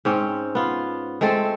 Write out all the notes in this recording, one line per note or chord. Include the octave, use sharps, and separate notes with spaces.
G#2 C4 C#4
B3 F4
G#3 A3 C4 A4